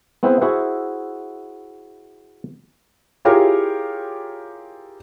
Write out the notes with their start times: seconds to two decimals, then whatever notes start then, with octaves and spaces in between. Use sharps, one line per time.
0.23 B3 C4 E4 G#4 B4 C5
0.41 E4 F#4 G#4 C5 E5 F#5
3.25 E4 F4 G4 G#4 A#4 C#5